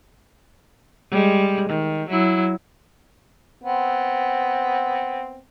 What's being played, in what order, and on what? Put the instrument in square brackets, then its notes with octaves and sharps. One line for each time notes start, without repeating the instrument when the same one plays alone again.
[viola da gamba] G3 G#3
D#3
F#3 E4
[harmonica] B3 C4